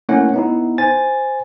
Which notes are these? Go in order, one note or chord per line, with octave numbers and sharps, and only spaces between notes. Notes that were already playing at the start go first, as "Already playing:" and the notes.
A3 A#3 C#4 E4 C#5 F#5
B3 D#4 E4
C5 G#5 A6